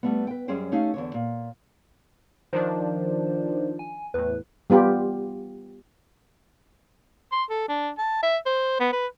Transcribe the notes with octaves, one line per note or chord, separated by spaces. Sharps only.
G3 A3 B3
B4 G5
F#2 G3 C#4 G#4 C5 G5
A3 C#4 D#4 G4 F5
E2 D3 C#5
A#2
D#3 F3 D4 C5
G#5
E2 A2 B4
G3 B3 F4 G4
C6
A4
D4
A5
E5
C5
B3
B4